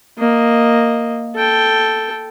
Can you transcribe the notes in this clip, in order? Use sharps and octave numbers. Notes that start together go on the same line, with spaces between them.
A#3 D#5
A4 G5